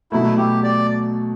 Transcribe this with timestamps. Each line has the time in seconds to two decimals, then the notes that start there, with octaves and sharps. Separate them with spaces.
0.12 B2 F#3 A3 E4
0.37 G4
0.64 D5